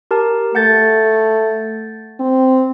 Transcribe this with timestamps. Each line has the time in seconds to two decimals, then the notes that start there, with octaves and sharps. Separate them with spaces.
0.11 G4 A#4 A5
0.55 A3 F#5 G6 A6
2.20 C4